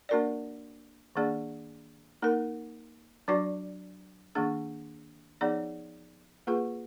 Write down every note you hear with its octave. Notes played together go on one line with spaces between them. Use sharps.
A#3 D4 F#4 A#4 D5
D#3 A#3 D4 G#4 D5
A#3 D#4 A#4
F#3 D4 F#4 D5
D#3 A#3 D4 G#4
F3 B3 D#4 G#4 D5
A#3 F4 G#4 B4